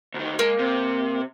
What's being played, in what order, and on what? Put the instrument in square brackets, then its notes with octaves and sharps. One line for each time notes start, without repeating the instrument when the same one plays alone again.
[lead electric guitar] D2 D#3
[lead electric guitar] G#3 [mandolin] A#3
[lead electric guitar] C3